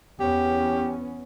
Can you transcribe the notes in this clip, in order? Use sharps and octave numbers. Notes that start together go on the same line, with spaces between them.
E2 B3 C#4 G4